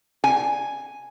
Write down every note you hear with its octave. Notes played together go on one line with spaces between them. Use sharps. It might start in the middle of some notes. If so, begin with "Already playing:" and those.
G#5